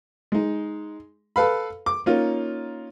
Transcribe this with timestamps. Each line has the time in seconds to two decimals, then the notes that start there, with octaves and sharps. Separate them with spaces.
0.32 G#3 D#4
1.36 A4 B4 F5 B5
1.86 D6
2.06 A#3 C#4 D#4 F4